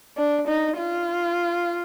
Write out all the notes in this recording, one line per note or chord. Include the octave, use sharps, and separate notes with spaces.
D4
D#4
F4